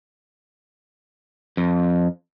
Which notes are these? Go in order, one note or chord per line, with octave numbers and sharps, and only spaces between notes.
F2